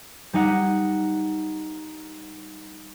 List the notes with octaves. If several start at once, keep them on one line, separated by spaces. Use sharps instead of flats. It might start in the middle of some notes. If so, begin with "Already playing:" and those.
G3 D#4 F#5